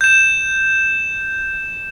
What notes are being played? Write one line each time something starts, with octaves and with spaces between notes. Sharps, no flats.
G6 E7